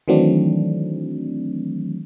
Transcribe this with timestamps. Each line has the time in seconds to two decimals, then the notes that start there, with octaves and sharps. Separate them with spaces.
0.08 D#3 E3 F#3 A3 C4 D4